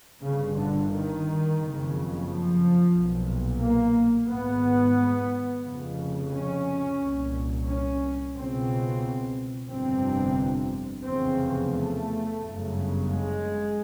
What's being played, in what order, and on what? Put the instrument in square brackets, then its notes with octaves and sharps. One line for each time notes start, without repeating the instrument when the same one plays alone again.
[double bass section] G1 G2 C#3
D3
D#3
F#1 F2 C#3
F3
B1 A#2
A#3
G#1 G#2 B3
F1 F2 C#3
C#4
C2 A#2
C#4
C#2 B2 C4
G1 F2 C3 C4
F1 E2 C#3 C4
A3
G1 F#2 C#3
G#3